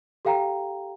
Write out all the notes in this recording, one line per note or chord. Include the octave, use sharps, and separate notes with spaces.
G4 A4 F5 G5 A#5